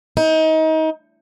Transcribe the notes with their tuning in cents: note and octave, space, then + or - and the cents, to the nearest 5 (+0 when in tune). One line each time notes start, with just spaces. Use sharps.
D#4 +30